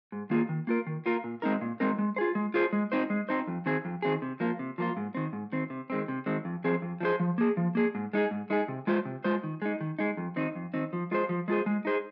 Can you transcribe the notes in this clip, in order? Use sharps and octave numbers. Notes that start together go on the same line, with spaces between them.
G#2
D#3 A#3 F4 G#4
D#3
A#3 F4 A#4
D#3
A#3 F4 A#4
A#2
G#3 C4 D#4 A#4
A#2
G#3 C4 D#4 A#4
G#3
F4 G#4 C5
G#3
F4 G#4 C5
G#3
C4 D#4 C5
G#3
C4 D#4 C5
F2
D#3 C4 G#4
F2
D#3 C4 G#4
C3
F3 A#3 F4
C3
F3 A#3 F4
G#2
D#3 C4
G#2
D#3 C4
C3
D#3 G#3 C4
C3
D#3 G#3 C4
F2
F3 C4 G#4 C5
F2
F3 C4 G#4 C5
F3
A#3 G#4
F3
A#3 G#4
G#2
G#3 D#4 G#4
G#2
G#3 D#4 G#4
C3
G#3 F4 C5
C3
G#3 F4 C5
D#3
G#3 D#4
D#3
G#3 D#4
F2
D#3 C4 D#4
F2
D#3 C4 D#4
F3
G#3 F4 G#4 C5
F3
G#3 F4 G#4 C5
G#3
D#4 G#4 C5